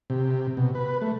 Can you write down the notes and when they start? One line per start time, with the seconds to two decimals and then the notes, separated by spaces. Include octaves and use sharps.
0.10 C3
0.57 B2
0.75 B4
1.02 A3